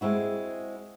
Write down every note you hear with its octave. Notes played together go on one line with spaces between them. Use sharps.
G#3 C4 E4 F#4